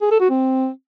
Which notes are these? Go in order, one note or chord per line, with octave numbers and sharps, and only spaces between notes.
G#4
A4
F#4
C4